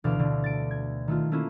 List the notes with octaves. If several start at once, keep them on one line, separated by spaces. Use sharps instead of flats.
D2 B2 E3 A4 F5 D6
B2 D3
A6 D7
G#6
D#3 A3 F4
A3 A#3 C#4 E4 F4